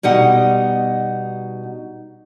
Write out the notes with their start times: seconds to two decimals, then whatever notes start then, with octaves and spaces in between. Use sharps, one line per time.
0.03 B2 G3 D#4 F#5